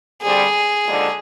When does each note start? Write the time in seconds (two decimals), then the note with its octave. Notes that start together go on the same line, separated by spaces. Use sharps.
0.22 F2 D3 G3 C4 G#4
0.86 D#2 D3 F3 G#3 D4